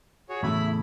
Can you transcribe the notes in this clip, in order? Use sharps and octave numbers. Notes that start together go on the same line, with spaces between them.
F#4 G#4 C#5
E2 A2 C#3 E4 B5